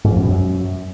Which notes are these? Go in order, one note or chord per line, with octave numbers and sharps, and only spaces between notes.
G#2
F3
F#2
B2
F#2